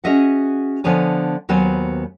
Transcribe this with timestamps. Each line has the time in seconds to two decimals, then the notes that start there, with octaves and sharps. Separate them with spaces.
0.04 C#4 F#4 G#4 D#5 E5 F#5
0.84 D3 F3 B3 C#5 G#5
1.49 D#2 F#3 B3 C5 G#5